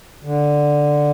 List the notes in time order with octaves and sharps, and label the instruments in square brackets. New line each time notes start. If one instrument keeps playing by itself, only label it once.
[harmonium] D3